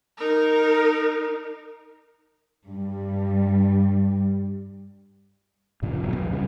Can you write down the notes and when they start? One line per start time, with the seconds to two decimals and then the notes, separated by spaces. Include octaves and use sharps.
0.18 D#4 A#4
2.67 G2 G3
5.82 G2 A#2 C#3 F3
6.03 E1 B2 F#3
6.16 A#1 E2
6.32 F#2 C#3 G3